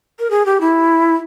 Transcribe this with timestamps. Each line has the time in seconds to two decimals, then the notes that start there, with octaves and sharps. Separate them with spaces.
0.20 A#4
0.31 G#4
0.46 G4
0.61 E4